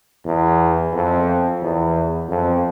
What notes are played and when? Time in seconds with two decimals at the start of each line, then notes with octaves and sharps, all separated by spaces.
0.25 E2
0.93 F2
1.62 E2
2.29 F2